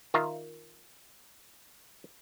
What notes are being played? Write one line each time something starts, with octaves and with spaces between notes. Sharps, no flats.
D#3 F4 E5 A#5